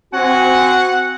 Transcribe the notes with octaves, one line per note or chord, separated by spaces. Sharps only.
C4 F#4 F#5 G#5